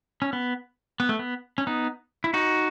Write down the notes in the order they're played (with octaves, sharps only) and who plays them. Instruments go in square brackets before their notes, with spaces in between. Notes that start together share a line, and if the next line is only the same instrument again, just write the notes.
[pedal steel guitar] C#4
B3
B3
A3
B3
C#4
B3 D#4
E4
D#4 F#4